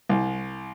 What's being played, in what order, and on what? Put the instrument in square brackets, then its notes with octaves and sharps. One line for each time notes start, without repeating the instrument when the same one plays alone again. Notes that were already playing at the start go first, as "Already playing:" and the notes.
[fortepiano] C2